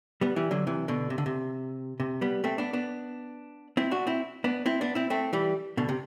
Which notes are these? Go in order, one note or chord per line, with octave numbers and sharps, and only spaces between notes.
G3 B3
E3 G3
D3 F#3
C3 E3
B2 D3
C3
D3
C3
C3
G3 B3
A3 C4
B3 D4
B3 D4
C4 E4
D4 F#4
C4 E4
B3 D4
C4 E4
B3 D4
C4 E4
A3 C4
E3 G3
B2 D3
C3